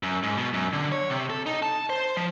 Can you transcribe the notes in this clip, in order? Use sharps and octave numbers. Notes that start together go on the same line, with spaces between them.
F#2
G#2
B2
F#2
D3
C#5
C3
A4
D#4
A5
C5
F3